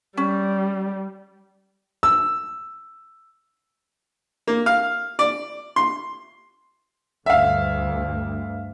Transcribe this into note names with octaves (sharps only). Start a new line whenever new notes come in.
G3 C#4
E6
A#3
F5
D5
C6
D2 G2 D3 E5 F5